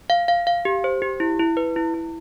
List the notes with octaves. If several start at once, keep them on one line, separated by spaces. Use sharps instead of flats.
F5
F5
F5
G4
C5
G4
E4
E4
B4
E4
E4